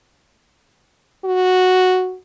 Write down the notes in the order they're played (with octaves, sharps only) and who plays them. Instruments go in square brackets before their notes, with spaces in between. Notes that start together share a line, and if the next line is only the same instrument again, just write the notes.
[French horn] F#4